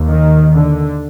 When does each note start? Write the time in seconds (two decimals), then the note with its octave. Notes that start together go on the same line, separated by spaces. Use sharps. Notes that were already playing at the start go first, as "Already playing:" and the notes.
Already playing: D#2
0.08 D#3
0.54 D3